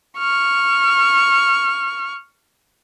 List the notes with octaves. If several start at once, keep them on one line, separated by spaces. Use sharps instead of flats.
C#6 F6